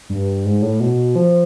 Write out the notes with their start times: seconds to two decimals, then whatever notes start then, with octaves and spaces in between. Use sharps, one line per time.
0.09 G2
0.45 G#2
0.62 A2
0.80 B2
1.15 F3